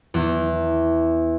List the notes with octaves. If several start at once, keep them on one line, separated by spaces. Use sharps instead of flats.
E2